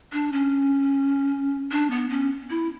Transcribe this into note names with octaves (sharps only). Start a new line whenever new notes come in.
D4
C#4
D4
B3
C#4
E4